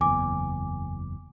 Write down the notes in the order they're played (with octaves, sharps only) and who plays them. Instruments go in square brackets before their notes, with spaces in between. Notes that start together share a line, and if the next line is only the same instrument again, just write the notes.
[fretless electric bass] F#1 E2 [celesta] G#5 D6